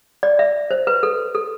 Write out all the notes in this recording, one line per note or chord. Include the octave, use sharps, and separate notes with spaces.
D5
E5
C5
B4
A4
A4